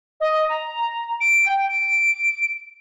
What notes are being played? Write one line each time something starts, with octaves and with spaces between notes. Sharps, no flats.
D#5
A#5
D7
G5
D7